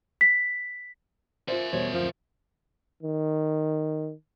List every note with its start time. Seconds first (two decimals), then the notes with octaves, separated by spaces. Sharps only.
0.21 B6
1.48 F4 A#4 C5 E5
1.73 E2 B2 G3 C5 C#5
1.93 D1 F2 F3
3.03 D#3